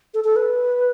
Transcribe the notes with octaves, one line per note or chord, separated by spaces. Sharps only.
A4
A4
B4